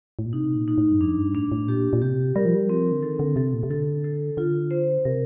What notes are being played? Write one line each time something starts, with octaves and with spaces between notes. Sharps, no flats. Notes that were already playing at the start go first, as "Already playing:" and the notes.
A2
A#2
C3 D#4
A#2
D#4
A2
G2
F2 D4
G2
A2 D4
A2
A#2 G4
A#2
C3 G4
G3 A#4
F3
G3
F3 C4
D3
D#3 A4
D3
C3 A4
A#2
C3
D3 A4
A4
D3 F4
C5
C3 A#4